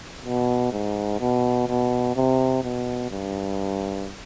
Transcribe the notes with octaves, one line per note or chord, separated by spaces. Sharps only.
B2
G#2
B2
B2
C3
B2
G2